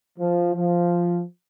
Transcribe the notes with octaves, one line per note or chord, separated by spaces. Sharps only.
F3
F3